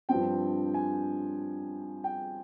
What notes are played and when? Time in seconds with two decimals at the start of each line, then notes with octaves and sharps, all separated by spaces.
0.09 G2 F3 C4 G5
0.74 G#5
2.04 G5